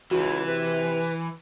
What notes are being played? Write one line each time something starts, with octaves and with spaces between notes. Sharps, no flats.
C#2 E3 F#4
C3 B4